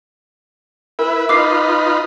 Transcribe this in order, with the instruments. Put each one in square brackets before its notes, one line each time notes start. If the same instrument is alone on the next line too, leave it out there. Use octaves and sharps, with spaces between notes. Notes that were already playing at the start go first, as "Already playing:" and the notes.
[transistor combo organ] E4 B4 [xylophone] A#4
[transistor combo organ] D#4 F4 B4 [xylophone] D6 C7